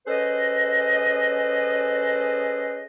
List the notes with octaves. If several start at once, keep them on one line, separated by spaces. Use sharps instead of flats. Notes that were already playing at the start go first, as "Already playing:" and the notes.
C#4 G#4 A4 B4 C5 D#5